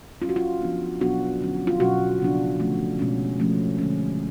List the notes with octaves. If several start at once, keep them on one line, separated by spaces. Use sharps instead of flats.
F#3 C#4 F4
F#4
F4
F3 B3 D4
B2 F#3 B3 D4 F#4
D3 F#3 C#4
F4
B2 F#3 C#4 F#4
C#3 F3 B3 D4
D3 F3 A3 C#4
B2 G#3 C#4
F3 A3 C#4
D3 G#3 C#4